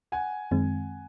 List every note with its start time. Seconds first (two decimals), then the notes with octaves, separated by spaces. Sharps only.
0.12 F#5 G#5
0.51 F#2 D#3 G#3 C4